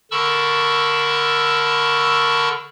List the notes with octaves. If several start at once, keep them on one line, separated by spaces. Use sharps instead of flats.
D3 A#4 A5 B5 C#6 E6